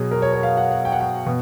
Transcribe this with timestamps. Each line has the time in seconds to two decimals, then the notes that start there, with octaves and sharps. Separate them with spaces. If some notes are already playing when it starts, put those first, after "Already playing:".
Already playing: B2 F#3 G#4
0.11 A#4
0.22 C#5
0.33 C#5
0.43 F5
0.57 F#5
0.71 F#5
0.85 G5
0.92 F#5
1.01 G5
1.26 B2